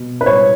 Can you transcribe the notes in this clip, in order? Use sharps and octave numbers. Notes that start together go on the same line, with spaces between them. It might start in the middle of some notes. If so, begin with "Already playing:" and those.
Already playing: B2
B4
C#5